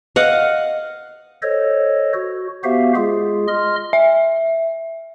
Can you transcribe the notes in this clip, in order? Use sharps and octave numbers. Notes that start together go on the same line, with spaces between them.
D#5 F5 F#5
A4 C5 C#5 D#5
F#4
B3 F#4 G4 C5 E5 F5
G#3 F4 G#4
D#5 C6 F6
E5